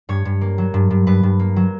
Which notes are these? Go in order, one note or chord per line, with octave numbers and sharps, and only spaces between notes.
G2 C#5
G2
A#3
F#3
G2
G2
G2 B4
G2
A#3
F#3